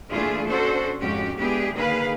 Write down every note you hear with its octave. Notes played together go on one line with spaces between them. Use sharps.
A#2 E3 A3 D4 F4 G#4
C#4 D4 F#4 A4 C5
F2 G#2 G#3 C#4 F#4 G4
G#3 B3 D4 E4 G4 G#4
D3 D#3 A#3 G#4 B4 F5